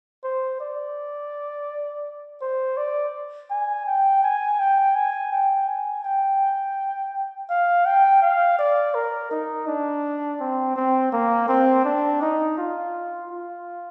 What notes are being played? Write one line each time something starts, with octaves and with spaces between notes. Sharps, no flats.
C5
D5
C5
D5
G#5
G5
G#5
G5
G#5
G5
G#5
G5
F5
G5
F5
D5
A#4
D#4
D4
C4
C4
A#3
C4
D4
D#4
F4
F4